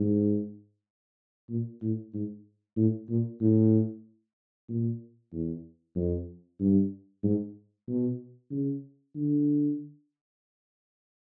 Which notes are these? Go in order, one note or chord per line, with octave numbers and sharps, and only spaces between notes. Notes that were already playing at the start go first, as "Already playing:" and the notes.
Already playing: G#2
A#2
A2
G#2
A2
A#2
A2
A#2
E2
F2
G2
G#2
B2
C#3
D3